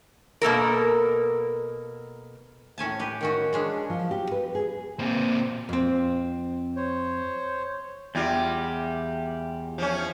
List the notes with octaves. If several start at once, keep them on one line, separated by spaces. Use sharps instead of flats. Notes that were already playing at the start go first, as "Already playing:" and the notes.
B2 A#3 A4 A#4
A2 C#4 G#5 A5
G4 B4
D#3 C#4 F#4
G#3 C#4 D4
F3
G4
B4
G#4
A#2 C4
F2 C4
C5 C#5
E2 G3 F4
F3 C#4